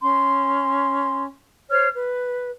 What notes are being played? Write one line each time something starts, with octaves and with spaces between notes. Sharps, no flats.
C#4 C6
C5 C#5 F6
B4